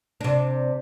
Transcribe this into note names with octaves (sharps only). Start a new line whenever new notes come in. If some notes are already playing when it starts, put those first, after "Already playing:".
C3 D4